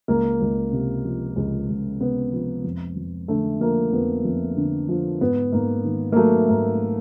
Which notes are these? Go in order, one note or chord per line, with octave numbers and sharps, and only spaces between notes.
C#2 A#3
C#2
C3
F3
C#2
C#2
C3 B3
F3
F2
F2
D3 A3
F3 A#3
F2 B3
F2
D3
F3
G#2 B3
G#2 A#3
D#3
A#3
F#3 A3
G#2 A#3